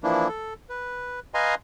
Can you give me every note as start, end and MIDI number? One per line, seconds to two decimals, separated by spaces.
0.03 0.28 52
0.03 0.28 53
0.03 0.28 58
0.03 0.28 62
0.03 0.28 64
0.28 0.54 69
0.69 1.20 71
1.34 1.55 71
1.34 1.55 75
1.34 1.55 77
1.34 1.55 80
1.34 1.55 82
1.34 1.55 84